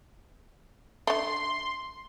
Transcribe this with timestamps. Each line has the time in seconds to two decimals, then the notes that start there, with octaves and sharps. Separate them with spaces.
1.07 D3 A3 C6